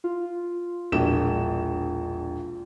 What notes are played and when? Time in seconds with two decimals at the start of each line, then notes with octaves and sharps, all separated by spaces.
0.04 F4
0.92 E1 A#1 E7